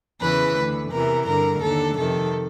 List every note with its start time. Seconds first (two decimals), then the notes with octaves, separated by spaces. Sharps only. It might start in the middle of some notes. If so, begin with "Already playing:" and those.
0.21 E2 C#3 E3 B4
0.57 D2 D3
0.91 E2 C3 E3 A#4
1.26 G2 D3 A#4
1.62 D#2 D3 A4
1.97 F2 C3 D#3 A4